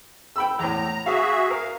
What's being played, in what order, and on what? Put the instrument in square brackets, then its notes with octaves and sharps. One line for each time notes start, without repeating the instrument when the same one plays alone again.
[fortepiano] G5 B5 E6
[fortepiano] E2 A2 [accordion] A#5
[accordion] F#4 G#4 E5 [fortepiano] F5
[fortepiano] A#4 [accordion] F5